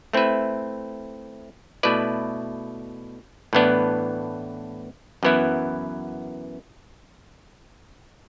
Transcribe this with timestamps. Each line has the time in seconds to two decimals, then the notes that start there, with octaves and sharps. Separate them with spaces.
0.13 A3 C4 E4 B4 E5
1.83 B2 A3 E4 B4 D5
3.53 A2 E3 B3 D4
5.23 F#2 E3 B3 E4